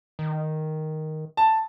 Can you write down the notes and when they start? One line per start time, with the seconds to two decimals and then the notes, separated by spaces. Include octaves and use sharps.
0.19 D#3
1.37 A5